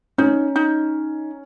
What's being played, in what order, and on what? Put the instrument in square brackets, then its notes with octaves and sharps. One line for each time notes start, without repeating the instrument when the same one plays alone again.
[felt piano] C#4 [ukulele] D#4
[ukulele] D#4